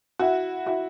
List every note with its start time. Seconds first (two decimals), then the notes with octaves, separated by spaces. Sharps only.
0.19 E4 F#4
0.66 E4 F#4